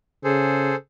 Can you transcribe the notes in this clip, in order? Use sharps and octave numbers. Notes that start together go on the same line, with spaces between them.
C#3 G#4 A4 C5